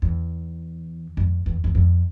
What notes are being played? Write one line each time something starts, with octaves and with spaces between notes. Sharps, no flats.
E2
F2
E2
E2
F2